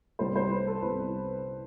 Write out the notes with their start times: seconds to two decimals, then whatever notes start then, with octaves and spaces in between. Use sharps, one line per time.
0.19 C2 C3 G3 B3 C5
0.36 C5
0.51 B4
0.67 A4
0.82 C2 C3 G3 B3 B4